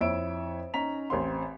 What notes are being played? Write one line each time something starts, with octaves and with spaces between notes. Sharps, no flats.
F2 E4 C#5 E5 E6 D7
C#4 D#4 A#5 B6 F7
A1 C4 C6